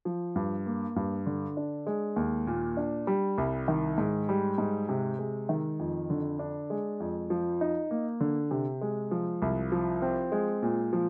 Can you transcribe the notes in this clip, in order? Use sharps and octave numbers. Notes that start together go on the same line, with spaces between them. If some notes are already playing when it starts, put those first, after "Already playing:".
F3
G2
A#3
G2
D3
D4
G#3
D#2
A#2
D4
G3
C2
D#3
G#2
G3
G#2
C3
G#3
D#3
F2
D3
D4
G#3
F2
F3
D#4
A#3
D3
C3
G#3
F3
C2
F3
C4
G#3
A#2
F3